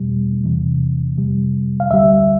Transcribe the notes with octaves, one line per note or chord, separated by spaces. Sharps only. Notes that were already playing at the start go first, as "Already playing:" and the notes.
Already playing: E2 B2 G3
E2 C3 E3
F2 C3 G3
F5
D2 D3 G3 E5